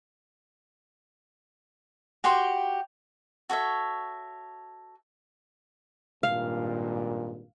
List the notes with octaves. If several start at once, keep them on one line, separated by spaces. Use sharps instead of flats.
F#4 G4 G5 C6
F#4 A4 C#5 E5
G#1 G2 A#2 F5